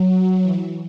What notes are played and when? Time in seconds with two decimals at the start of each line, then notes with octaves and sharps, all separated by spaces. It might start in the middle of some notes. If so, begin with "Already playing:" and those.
Already playing: F#3
0.42 E3